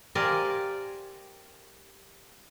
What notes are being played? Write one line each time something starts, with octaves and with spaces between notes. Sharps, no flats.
G4 A#4 C5 D5 F5 G#5